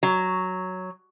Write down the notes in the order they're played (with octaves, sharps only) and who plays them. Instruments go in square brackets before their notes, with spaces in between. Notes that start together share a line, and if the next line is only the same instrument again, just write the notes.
[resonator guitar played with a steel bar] F#3